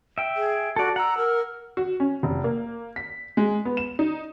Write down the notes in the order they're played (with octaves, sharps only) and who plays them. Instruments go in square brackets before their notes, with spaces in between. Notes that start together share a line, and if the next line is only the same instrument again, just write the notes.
[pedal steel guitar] E5 G5
[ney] G#4
[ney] F#4 [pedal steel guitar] A4 D5
[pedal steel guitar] F#5 E6 [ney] A#5
[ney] A#4
[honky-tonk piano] F#4
C#4
F1
A#3
B6
G#3
B3
E7
D#4